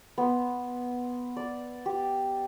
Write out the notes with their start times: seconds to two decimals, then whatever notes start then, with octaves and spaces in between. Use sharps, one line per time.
0.18 B3 C6
1.36 D5
1.86 G4